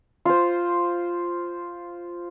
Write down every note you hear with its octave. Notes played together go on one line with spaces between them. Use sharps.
F4 C5